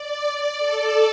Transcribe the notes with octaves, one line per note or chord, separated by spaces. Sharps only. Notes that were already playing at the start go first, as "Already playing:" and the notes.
Already playing: D5
A4